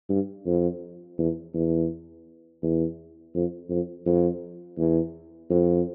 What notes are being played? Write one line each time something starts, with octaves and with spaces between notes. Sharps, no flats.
G2
F2
E2
E2
E2
F2
F2
F2
E2
F2